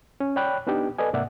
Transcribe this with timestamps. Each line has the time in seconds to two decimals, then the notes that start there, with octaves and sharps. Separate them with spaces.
0.20 C#4
0.36 C#5 D5 G5 B5 F#6
0.67 B3 D4 D#4 G4
0.98 A4 B4 D5 D#5 G#5
1.13 G#2 C3 A#3 D5 E5 F#5